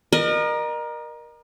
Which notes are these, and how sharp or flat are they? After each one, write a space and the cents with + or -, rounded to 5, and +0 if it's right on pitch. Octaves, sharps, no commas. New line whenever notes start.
A#4 +20 D#5 -40